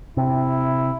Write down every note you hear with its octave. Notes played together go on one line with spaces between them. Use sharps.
C3 E4